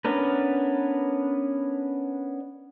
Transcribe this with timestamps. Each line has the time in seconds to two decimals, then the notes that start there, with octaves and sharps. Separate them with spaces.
0.05 B3 C#4 D4 A#4 B4